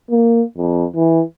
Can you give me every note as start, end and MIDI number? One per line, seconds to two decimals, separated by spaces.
0.11 0.42 58
0.57 0.85 41
0.95 1.22 52